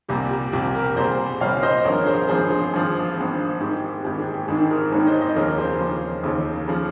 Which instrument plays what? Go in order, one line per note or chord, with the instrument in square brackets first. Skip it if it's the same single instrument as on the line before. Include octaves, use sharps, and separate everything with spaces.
[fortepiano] C2 A#2 G3 [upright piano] G4
[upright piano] G4
[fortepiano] C2 A#2 G3 [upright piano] G4
[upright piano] G4 A#4
[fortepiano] C2 A#2 G3 [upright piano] G#4 C5
[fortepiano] C2 A#2 G3 [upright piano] C#5 F5
[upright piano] C5 D#5
[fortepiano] G#1 G2 F3 [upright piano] A#4 C#5
[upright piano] G#4 C5
[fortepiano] G#1 G2 F3 [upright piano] G#4 C5
[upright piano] G#4
[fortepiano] G#1 G2 F3
G#1 G2 F3
[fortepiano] G#1 G#2 D#3 [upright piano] G4
[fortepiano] G#1 G#2 D#3 [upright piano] G4
[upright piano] G#4
G4
[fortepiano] G#1 G#2 D#3 [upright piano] G#4
[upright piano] G4 A#4
[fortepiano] G#1 G#2 D#3 [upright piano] A#4 C#5
[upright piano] C5 D#5
C5 D#5
[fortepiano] D#2 C#3 F3 [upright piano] A#4 C#5
[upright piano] G#4 C5
[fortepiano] D#2 C#3 F3
D#2 C#3 F3
C#3 F3